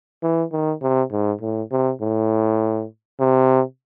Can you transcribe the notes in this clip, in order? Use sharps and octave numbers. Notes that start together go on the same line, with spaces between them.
E3
D#3
C3
G#2
A2
C3
A2
C3